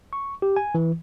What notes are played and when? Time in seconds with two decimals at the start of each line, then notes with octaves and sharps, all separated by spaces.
0.13 C#6
0.42 G4
0.56 G#5
0.75 E3